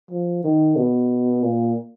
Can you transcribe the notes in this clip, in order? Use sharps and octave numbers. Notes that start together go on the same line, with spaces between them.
F3
D#3
B2
A#2